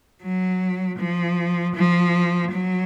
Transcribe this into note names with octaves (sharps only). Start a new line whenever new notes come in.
F#3
F3
F3
F#3